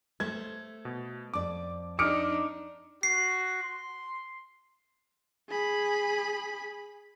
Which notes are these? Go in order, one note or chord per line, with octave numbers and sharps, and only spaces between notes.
A3 C5 G#6
B2
F2 D5 D6
D4 D#4 D6 D#6 F6 C#7 D7
F#4 C7
C6
G#4 B5